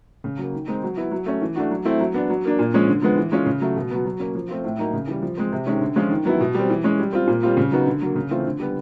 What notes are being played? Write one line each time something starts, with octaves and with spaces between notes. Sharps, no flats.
C#3
F#3 A#3
D#3
G#3 C4 D#4
F#3
B3 E4
F#3
A3 C#4
E3
A3 D4 F#4
F#3
A3 C4 E4
F#3
B3 D4
F#3
A#3 D4
A#2
F3 G#3 C#4
D3
F3 G#3 B3
E3
G#3 C#4 F4
C#3
F#3 A3
B2
F#3 B3
F#3
A#3 C#4
F3
A3 C4 F4
A2
F#3 A#3 D#4
C#3
E3 G3
F3
G#3 C4
C3
D#3 G#3 C#4
D3
F3 G#3 C#4 F4
D#3
F#3 B3 E4
B2
G3 C4
E3
G#3 C#4
G3
C4 F4
A#2
G3 C4 F4
C#3
F#3 B3 D#4 F#4
D3
F#3 A#3
C#3
E3 A3 C4 F4
D3
G3 B3